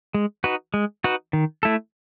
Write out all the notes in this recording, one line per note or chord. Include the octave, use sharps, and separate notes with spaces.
G#3
D#4 F#4 B4
G#3
D#4 F#4 B4
D#3
A3 E4 A4